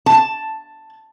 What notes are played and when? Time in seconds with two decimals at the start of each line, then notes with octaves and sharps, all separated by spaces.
0.06 A5